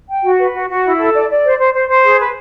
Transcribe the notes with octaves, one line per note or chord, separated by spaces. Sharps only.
G5
F#4
B4
F#4
F#4
E4
A4
D5
D5
C5
C5
C5
C5
G#4
B4